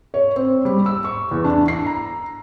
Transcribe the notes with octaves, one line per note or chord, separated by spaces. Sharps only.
C#5
C4
G3
E6
C#6
E2
D4
C7
A#5